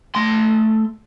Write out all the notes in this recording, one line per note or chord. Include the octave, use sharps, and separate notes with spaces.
A3 C6